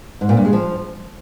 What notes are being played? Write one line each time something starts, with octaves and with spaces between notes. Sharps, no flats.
G#2
A#2
G2
G#3
F3